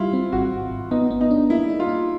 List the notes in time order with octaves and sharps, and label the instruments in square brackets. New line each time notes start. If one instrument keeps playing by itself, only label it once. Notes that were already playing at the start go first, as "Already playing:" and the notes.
Already playing: [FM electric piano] G3 [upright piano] E4 F4
[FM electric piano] C4
[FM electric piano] G#1 [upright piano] F#4
[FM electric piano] G#1
G#1
[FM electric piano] B3 [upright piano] D#4
[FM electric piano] B3
[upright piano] D#4
[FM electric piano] D4
[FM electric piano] A#3 [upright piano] E4
[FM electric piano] D#4
[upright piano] F4
[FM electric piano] D#4